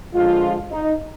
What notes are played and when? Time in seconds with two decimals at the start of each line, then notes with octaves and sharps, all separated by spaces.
0.13 D3 F3 G#3 F4
0.71 D#4